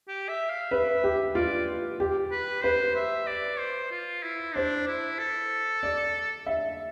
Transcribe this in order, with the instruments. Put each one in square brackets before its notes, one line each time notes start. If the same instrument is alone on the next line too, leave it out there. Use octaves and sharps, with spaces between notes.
[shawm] G4
E5
F5
[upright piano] B4 [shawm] E5
[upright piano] G4
[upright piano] F4 [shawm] D5
[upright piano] G4
[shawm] B4
[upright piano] B4 [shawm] C5
[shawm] E5
D5
C5
F4
E4
[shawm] D4 [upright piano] C5
[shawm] E4
A4
[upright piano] D5
E5